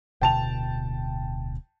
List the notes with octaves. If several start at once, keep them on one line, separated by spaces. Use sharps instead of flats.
D1 B2 D3 G5 A5 F7